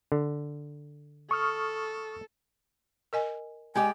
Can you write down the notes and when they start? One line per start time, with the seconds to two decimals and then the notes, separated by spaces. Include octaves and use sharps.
0.12 D3
1.31 A4 C#6 D#6 F6
3.13 A#4 D#5 G#5
3.75 G#3 G4 D5 G#5